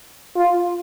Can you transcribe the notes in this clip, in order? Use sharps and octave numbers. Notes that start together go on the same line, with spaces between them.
F4